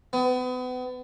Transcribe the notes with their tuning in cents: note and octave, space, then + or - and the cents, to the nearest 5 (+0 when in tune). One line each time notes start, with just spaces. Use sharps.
B3 +35